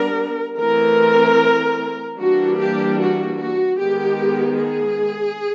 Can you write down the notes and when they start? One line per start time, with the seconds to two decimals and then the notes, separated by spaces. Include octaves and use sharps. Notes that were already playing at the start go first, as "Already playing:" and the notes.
Already playing: G3 B3 D4 A#4
0.58 E3 A3 C4 A#4
2.18 E3 G3 A#3 D4 F#4
2.58 G4
2.99 F#4
3.38 F#4
3.78 D#3 G#3 B3 G4
4.58 G#4